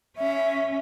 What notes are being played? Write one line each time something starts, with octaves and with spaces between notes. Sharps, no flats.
C#4 E5